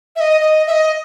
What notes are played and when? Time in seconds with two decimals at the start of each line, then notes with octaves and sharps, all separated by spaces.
0.16 E5
0.20 D#5
0.41 D#5
0.67 E5
0.72 D#5